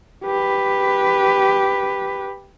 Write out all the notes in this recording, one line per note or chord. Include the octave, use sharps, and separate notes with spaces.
G4 B4